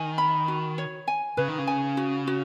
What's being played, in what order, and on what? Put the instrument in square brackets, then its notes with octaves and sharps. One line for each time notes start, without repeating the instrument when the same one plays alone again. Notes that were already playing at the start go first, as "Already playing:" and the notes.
Already playing: [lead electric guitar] D#3 [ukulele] G#5
[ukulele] B5
F#4
C#5
G#5
[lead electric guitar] C#3 [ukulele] B4
[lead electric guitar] D#3
C#3
[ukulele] G#5
F#4
F#4